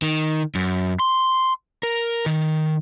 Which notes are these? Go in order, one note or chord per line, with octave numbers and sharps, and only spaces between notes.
D#3
F#2
C6
A#4
D#3